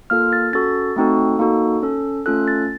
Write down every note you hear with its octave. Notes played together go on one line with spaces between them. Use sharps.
A#3 F4 A4 F6
A6
C#4 F#4 A4 A6
A3 C4 D#4 F#4 A4
A#3 D#4 F#4 A4
C#4 A4
A3 C#4 F4 A4 F#6
A6